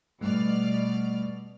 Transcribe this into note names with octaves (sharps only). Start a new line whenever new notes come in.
B2 G3 A3 D5 F6